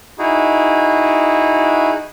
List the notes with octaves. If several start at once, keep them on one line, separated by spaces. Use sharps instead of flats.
D#4 E4 F#4 G#4